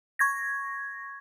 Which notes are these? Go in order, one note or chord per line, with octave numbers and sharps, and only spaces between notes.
C#6 G#6 A#6